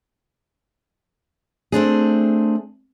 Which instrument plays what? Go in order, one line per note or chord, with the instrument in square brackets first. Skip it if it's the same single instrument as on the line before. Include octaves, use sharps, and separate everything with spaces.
[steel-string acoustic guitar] A3 C4 D4 G#4